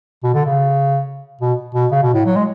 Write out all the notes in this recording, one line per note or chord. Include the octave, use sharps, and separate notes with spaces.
B2
D3
C#3
B2
B2
C#3
B2
A2
F#3
G#3